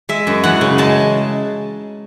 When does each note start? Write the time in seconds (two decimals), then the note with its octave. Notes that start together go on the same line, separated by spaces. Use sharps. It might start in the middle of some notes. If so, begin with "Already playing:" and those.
0.09 G#3 E5
0.27 F#2
0.43 E3 F#5
0.61 C#3
0.78 G#3 A5